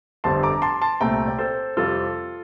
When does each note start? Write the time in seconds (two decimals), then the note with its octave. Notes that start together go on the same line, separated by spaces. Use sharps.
0.24 G1 F2 D3 G3 C4 A5 C6
0.43 A#5 D6
0.62 A5 C6
0.81 A5 C6
1.00 C2 A#2 A3 C4 G5 A#5
1.28 D5
1.38 A4 C5
1.77 F2 C3 G3 F4 A4